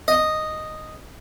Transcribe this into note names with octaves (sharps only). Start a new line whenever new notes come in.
D#5